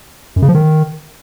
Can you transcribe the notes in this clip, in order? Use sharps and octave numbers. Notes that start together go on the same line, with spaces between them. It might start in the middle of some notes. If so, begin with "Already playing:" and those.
F#2
C#3
F3
D#3